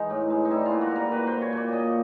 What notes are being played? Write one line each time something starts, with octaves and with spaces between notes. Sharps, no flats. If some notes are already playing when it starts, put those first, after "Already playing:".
Already playing: E3 G#3 D#4
A2
G#3
D#4
G3 E4
F4
A#2
F#4
G3 A#4
A#2 B4
A#2 C5
C#5
A#2 D5
A#2 D#5